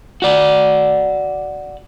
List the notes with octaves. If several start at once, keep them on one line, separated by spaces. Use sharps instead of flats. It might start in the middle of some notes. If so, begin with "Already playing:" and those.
F#4 D5